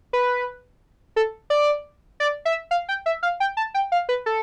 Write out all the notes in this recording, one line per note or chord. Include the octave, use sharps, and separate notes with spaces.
B4
A4
D5
D5
E5
F5
G5
E5
F5
G5
A5
G5
F5
B4
A4